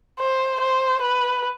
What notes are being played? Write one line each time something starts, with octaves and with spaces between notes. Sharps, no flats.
C5
C5
B4